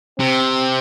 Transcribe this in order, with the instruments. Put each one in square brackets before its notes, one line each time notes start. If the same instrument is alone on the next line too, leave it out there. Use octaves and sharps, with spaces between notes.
[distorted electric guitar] C3 [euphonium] C4